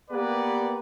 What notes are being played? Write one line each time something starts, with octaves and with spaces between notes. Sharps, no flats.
A#3 B3 G4 B4 D5